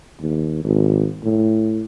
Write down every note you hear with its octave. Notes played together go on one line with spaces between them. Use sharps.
D#2
G#1
A2